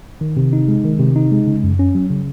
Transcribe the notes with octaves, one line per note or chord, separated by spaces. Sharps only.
D#3
C3
D#4
G#3
D#3
C3
D#4
G#3
C#3
F#2
C#4
F#3
C#3